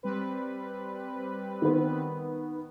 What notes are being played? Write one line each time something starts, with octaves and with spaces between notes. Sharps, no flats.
G3 C4 B4
D#3 B3